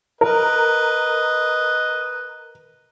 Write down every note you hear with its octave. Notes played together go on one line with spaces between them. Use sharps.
A#4 B4 D#5